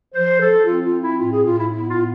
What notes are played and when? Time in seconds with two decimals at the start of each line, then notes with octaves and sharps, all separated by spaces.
0.14 F3 C5
0.41 F3 A4
0.66 C4 F4
0.85 F4
0.92 C4
1.02 E4
1.19 A2 F4
1.32 G#4
1.45 A2 F4
1.59 E4
1.71 B3 E4
1.89 F4
1.97 A2